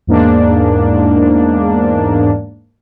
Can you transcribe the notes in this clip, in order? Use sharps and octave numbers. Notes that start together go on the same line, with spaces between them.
E2 G#2 A#3 D4